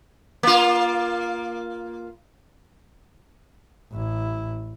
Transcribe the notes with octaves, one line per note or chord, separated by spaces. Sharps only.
A#3 F4
A1 E4